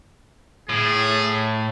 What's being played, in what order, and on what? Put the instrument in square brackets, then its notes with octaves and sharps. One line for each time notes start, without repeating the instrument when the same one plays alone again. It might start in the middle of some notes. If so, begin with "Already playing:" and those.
[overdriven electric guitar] A2 [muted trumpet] G#4